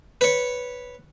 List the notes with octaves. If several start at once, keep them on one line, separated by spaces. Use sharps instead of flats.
B4 C#5